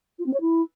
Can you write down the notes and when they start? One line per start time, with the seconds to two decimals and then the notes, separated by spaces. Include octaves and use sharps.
0.19 F4
0.26 C4
0.33 C#5
0.41 E4